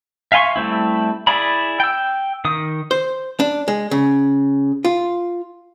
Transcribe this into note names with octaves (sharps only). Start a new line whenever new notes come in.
E5 F5 G#5 C6 C#6
G3 A3 C4 E4
E4 G#4 D5 B5
G5 E6
D#3 D#6
C5
D4
G#3
C#3
F4